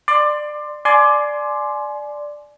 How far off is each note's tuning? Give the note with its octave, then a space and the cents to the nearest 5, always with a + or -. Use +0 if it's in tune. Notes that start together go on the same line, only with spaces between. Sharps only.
D5 +20 C6 +0
D5 +5 G#5 +30 C6 +0